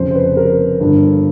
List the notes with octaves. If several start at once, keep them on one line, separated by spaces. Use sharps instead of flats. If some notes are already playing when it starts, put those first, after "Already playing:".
Already playing: F1 F2 C#3 F3 C5
C5
B4
A#4
G1 G2 D3